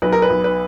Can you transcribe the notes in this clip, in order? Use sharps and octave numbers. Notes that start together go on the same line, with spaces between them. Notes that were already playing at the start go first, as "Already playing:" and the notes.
B1 B4
A#4
B4
B1
B4